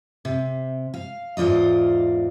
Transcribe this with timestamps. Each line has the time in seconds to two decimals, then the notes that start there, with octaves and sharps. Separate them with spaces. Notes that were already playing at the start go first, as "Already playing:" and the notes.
0.25 C3
0.94 F5
1.37 E2 G#2 F4 D5 D#5